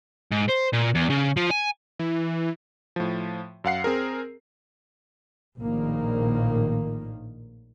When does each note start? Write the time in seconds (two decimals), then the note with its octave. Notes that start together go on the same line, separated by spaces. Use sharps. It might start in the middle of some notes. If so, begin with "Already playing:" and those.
0.32 G#2
0.49 C5
0.73 A#2
0.95 E2
1.10 C#3
1.37 F3
1.51 G#5
1.99 E3
2.96 A2 F3
3.64 F#2 F5 F#5 C7
3.84 C4 G#4 A#4
5.58 A#1 A2 D#3 A#3